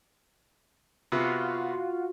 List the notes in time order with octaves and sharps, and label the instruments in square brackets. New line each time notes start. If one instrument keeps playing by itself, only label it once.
[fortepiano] C3 B3 [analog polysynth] F4 F#4